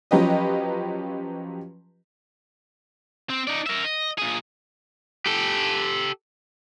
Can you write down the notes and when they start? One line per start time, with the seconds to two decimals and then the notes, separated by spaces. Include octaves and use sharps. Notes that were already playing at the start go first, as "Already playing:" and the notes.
0.11 F3 F#3 C#4 G4 B4 D#5
3.30 C4
3.48 D#4 D5
3.67 A#4 E5
3.85 D#5
4.18 A#2 G#4
5.26 G4 A4